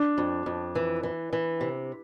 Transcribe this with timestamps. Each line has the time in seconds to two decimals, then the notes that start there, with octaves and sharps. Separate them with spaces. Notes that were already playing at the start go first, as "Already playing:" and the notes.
Already playing: D4
0.18 F2
0.46 F2
0.75 E3
1.03 E3
1.33 E3
1.61 C3